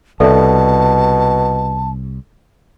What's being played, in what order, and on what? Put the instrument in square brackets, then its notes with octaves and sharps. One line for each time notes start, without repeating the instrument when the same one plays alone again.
[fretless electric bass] C2 [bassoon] B2 [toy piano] A4 D5 E5 [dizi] A5